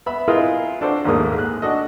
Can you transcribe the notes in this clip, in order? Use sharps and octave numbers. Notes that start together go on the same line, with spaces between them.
B3 E5 B5
E4 F4 G#4 A#4 B4 D#5
D4 F#4 A4 C5
A#1 D#2 G#2 A3 A#3 D#6
G#4 F#6
D4 F#4 A4 D#5